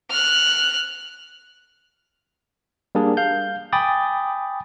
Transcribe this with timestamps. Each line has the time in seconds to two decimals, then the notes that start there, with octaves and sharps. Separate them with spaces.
0.10 F6 F#6
2.95 G3 A#3 D4 G#4
3.17 F5 G6
3.73 G5 G#5 B5 D6 D#6 A6